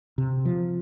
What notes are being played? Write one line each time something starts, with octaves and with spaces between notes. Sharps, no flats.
C3
F3